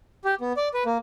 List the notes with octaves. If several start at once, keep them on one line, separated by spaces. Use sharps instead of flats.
G4
B3
D5
B4
A#3